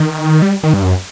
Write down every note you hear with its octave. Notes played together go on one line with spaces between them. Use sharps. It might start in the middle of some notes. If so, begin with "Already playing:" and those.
Already playing: D#3
G3
D#3
G2
F#2